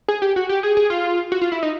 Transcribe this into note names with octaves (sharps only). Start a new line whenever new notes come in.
G#4
G4
F#4
G4
G#4
G#4
F4
F#4
F4
E4
D#4